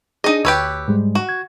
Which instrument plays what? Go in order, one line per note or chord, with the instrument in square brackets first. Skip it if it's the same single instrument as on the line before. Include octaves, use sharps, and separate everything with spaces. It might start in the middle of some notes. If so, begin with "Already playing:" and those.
[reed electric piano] D4 G#4 [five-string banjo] D#4 D#5
[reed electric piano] D2 E6 [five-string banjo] G4 B4 C#5
[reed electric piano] G#2 G3 G#3
[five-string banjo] F#4
[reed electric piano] G#6